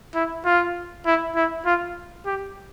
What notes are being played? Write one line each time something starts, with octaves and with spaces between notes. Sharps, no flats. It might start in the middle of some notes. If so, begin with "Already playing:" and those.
E4
F4
E4
E4
F4
G4